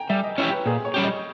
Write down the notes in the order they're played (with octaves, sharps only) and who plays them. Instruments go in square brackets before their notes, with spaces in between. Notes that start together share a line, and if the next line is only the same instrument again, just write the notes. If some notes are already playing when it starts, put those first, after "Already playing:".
Already playing: [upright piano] G5 G#5 A#5
[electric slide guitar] G3 [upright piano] E5
[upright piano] D#5
[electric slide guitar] C#4 E4 G4 [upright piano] C#5
[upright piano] B4
[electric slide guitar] A#2 [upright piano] G#4
[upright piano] C#5
[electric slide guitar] G3 C#4 G4
[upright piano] D#5